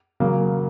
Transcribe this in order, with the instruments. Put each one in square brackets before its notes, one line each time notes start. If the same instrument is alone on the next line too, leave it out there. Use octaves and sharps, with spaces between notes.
[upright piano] C#3 F#3 A#3